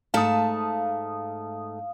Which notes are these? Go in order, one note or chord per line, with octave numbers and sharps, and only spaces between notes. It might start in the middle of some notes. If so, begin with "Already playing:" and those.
G#2 A3 F5 A5 D#6